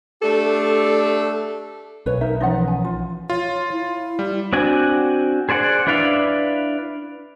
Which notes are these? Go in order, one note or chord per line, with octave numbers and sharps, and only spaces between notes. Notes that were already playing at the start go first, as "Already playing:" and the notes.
A3 D4 G4 A4
B1 B4 C#5
D#4 A#4 E5
E3 F3 C#4 D#4 F#5
G#5
F4
F4 C#5
E4
G3
C4 D4 F#4 G#5
G#4 C5 D5 F#5
D4 E4 B4 D5 F5